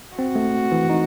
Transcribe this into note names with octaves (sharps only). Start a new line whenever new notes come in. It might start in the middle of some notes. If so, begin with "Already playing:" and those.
C4 F#4
A3
E3
D#4